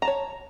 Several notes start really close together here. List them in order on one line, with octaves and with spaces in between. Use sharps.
A#5 A5 C#5